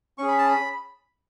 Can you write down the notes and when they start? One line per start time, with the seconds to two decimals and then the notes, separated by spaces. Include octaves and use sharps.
0.18 C#4 G#4 C#6
0.28 B5
0.38 A5
0.48 B5